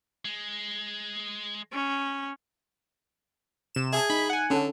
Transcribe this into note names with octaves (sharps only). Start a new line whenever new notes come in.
G#3
C#4
C3 E7
G#4 E5 G#5 A5
D#4 B5
F#5 G#5
D3 C#4 A4